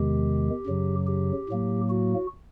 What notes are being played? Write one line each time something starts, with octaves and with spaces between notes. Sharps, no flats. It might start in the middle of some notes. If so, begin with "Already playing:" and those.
Already playing: E2 C3 D#3 G#3 G4
F#2 C#3 F#3
G4
A2 F#3 A#3
F#4